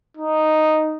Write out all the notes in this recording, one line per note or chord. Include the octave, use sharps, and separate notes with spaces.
D#4